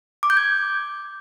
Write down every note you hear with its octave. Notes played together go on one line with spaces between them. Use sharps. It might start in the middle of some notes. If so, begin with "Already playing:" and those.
D6
G6
G#6